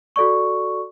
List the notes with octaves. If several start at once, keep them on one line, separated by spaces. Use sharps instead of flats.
F#4 A4 D5 C#6